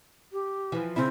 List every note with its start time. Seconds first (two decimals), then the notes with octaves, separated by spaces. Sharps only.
0.33 G4
0.72 E3 F3
0.96 C#3 C4 E4